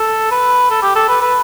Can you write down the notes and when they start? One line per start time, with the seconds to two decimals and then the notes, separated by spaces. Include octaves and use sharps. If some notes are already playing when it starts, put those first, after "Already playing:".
Already playing: A4
0.31 B4
0.70 A4
0.82 G4
0.96 A4
1.09 B4
1.22 B4